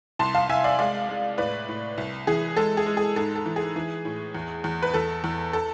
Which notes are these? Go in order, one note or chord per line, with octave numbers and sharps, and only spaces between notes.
C2 A5 C6
F5 A5
C2 E5 G#5
D5 F5
G#3 D5 F5
G#3
A2 B4 D5
A2
C2
E3 G#4
G#3 A4
G#4
G#3
G#4
G#2 A4
A4
E3
G#4
E3
A2
E2
E2
B4
E2 A4
E2
A4